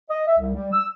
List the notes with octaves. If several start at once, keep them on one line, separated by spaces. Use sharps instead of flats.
D#5
E5
C2
G3
E6